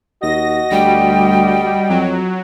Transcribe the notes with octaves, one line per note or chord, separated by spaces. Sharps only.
D#2 F#4 D#5 A#6
D2 G3 G5
F2 F#3